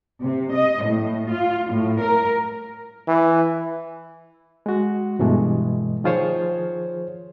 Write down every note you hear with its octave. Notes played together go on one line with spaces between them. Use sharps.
C3
D#5
A2
F4
A2
A#4
E3
G#3 F#4
G2 B2 E3 G#3 A3
D#3 F3 F4 G#4 C5 C#5